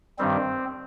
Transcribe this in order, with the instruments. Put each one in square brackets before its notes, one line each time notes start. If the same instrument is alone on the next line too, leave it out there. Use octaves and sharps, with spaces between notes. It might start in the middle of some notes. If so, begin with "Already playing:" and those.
[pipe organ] G2 D#3 G3 C4